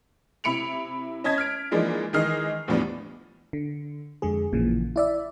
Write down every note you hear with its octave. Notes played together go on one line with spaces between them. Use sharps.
C3 E4 B5 C#7 D7 F7
C#4 D#5 A5 G#6 B6
F6 B6 D7
E3 F3 G#3 A#3 D4 D#4
D#3 E3 G#3 D#5 F6 C7
E2 A2 F3 G3 B3 D4
D3
F2 D3 G#3 G#4
A1 A#2 C#3 E3 F3
E4 D5 E5